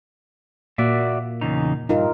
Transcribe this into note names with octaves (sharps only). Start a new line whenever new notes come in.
A#2 A#3 F#4 D5 E5
E2 C#3 D#4
G2 D#4 F4 A#4